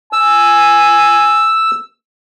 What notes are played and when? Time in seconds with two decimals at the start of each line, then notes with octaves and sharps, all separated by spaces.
0.13 G#5 E6